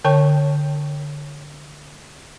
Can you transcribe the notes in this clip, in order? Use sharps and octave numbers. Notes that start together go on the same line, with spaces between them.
D3 C#5 G5 C#6